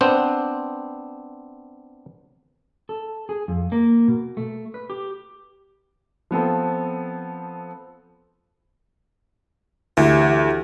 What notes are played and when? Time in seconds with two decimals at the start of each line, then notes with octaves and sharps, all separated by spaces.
0.01 B3 C4 D4 C5
2.89 A4
3.29 G#4
3.48 F2
3.72 A#3
4.08 B2
4.37 A3
4.74 B4
4.90 G4
6.31 F3 B3 C4 A4
9.97 D2 E3 E4 G4